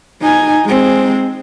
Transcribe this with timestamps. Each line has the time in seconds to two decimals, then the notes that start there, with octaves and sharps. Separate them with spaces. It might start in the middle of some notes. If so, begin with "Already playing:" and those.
0.22 D#4 G#5
0.66 G#3 C4